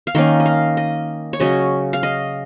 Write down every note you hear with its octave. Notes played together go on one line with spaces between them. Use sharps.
F5
D#3 A#3 C#4 D#5
D#5
F5
D#5
C#5
C#3 F#3 C#4 D#5
F5
D#5